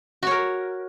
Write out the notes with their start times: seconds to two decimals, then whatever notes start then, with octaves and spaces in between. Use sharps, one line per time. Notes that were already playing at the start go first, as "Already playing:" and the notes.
0.23 F#4
0.27 C#5
0.31 A#4